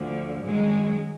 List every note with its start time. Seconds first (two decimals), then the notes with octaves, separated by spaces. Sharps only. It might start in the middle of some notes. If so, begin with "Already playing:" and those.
Already playing: D2 D3 F3
0.42 F#2 D#3 F#3 G#3